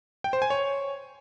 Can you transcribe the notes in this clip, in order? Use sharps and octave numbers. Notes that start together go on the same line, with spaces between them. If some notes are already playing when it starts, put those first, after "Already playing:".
G5
C5
G#5
C#5